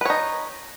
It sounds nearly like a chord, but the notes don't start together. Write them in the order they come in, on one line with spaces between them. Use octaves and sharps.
B4 C#5 D#4